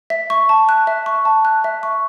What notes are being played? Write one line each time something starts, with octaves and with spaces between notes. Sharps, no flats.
E5
C#6
A5
F#6
E5
C#6
A5
F#6
E5
C#6